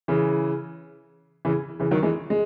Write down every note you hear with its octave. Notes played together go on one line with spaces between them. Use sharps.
C#3 E3
C#3 E3
C#3 E3
D#3 F#3
E3 G#3
G#3